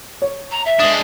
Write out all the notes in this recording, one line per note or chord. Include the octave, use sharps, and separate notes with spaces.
C#5
A#5
E5
G#3 D4 D#6